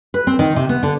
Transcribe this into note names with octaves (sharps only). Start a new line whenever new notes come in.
B4
C4
D#3
C3
B3
D3